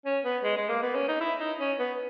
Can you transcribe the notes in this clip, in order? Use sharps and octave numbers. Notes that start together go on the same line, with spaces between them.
C#4
B3
G#3
G#3
A#3
B3
C#4
D#4
E4
D#4
C#4
B3